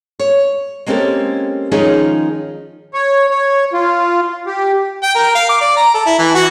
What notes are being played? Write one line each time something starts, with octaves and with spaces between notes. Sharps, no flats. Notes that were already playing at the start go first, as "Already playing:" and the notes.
C#5
G#3 A#3 C4 C#4 G4 A4
D#3 F3 G#3 C#4 D#4 G#4
C#5
C#5
F4
G4
G5
A#4
F5
D6
D5
A#5
A4
E4
E3
F#4